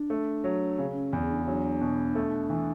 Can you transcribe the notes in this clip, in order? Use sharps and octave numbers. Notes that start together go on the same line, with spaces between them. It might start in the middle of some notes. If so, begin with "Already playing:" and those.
Already playing: D4
A3
F#3
C#3 C#4
C#4
E2 B3
D4
F#3 D4
B2
A3
E3